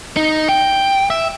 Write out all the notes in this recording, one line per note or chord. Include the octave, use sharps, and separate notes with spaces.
D#4
G5
E5